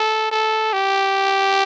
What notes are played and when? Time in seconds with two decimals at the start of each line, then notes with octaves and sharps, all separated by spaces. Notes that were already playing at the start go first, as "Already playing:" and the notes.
Already playing: A4
0.31 A4
0.73 G4